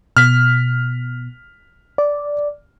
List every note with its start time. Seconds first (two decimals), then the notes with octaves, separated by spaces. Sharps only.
0.17 B2 F6 B6
1.98 D5